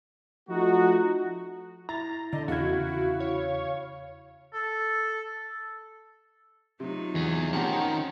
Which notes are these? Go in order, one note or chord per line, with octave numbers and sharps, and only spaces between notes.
F3 A3 D#4 F#4
E4 A#5 A6
D3 D#5
E2 C#3 E4 F#4 F5 G#6
C#5
A4
C3 F#3 D#4 F4
E2 E3 G#4
D#3 F3 C4 C#4 D#4 G4 C#5 F#5